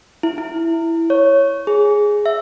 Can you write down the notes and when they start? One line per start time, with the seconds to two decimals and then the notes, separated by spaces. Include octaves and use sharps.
0.23 E4
0.38 E4
1.10 C#5
1.67 G#4
2.26 E5